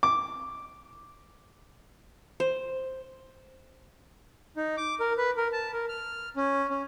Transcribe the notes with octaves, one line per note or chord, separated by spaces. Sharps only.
D6
C5
D#4
D6
A#4
B4
A#4
A5
A#4
F6
C#4
C#4